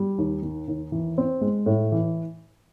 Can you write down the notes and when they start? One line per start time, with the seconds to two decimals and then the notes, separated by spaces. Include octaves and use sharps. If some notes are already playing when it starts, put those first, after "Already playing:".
Already playing: G3
0.18 D#2
0.42 D#3
0.68 D#2
0.92 E3
1.18 C4
1.41 G#3
1.66 A2
1.92 E3